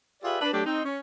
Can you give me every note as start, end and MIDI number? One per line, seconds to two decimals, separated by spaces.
0.23 0.38 65
0.23 0.38 67
0.23 0.38 68
0.23 0.38 71
0.23 0.38 74
0.23 0.38 76
0.41 0.52 62
0.41 0.52 71
0.53 0.65 54
0.53 0.65 57
0.53 0.65 62
0.53 0.65 67
0.66 0.84 60
0.66 0.84 63
0.85 1.00 61